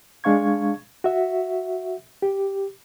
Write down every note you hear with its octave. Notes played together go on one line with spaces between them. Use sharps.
G#3 D4 F5 C#6 G#6
F#4 E5
G4